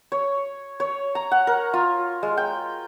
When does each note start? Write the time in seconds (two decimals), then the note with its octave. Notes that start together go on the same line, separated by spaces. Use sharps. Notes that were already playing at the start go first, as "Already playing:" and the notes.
0.12 C#5
0.80 C#5
1.15 A#5
1.31 F#5
1.47 A#4
1.74 F4
2.23 G#3
2.37 G5